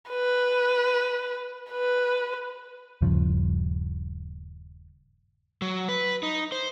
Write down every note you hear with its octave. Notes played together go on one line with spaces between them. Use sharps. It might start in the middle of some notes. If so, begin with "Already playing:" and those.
B4
B4
D#1 G2 C#3 F3
F#3
B4
D#4
C5